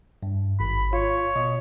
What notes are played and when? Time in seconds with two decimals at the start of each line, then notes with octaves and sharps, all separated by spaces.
0.23 G2
0.60 G#1 B5
0.93 F4 C#5
1.36 B2 D#5